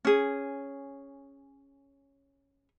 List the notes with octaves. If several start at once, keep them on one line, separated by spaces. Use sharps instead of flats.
C#4 G#4